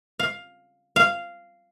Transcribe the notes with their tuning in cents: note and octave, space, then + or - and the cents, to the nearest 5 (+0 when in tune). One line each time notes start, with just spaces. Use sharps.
F5 +10
F5 -10